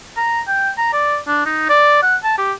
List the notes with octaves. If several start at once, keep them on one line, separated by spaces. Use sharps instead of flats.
A#5
G5
A#5
D5
D4
D#4
D5
F#5
A5
G4